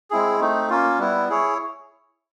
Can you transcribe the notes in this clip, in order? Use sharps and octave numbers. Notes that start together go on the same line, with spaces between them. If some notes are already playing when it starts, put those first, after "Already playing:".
G#3 C4 E4 G#4
A3 C4 D#4
A#3 C#4 F4
G3 B3 E4
E4 G#4 C#5